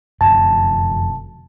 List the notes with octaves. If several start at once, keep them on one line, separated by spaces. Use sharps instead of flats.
F1 F#2 D3 A5